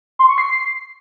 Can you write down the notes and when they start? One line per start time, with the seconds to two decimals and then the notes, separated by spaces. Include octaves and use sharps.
0.19 C6
0.29 C#6
0.38 C7